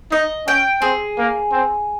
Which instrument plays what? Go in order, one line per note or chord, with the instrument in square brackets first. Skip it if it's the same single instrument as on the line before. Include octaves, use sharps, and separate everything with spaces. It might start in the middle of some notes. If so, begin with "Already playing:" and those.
[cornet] D#4 [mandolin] D#5
[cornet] C#4 [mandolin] G5
[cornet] C4 [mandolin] G#4
[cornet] A#3
C4